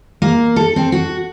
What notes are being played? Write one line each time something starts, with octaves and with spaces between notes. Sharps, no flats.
A#3
A4
C4
F#4